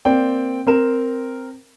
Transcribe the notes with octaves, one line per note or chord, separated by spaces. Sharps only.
A#3 C4 D5 G5
C4 A#4 E7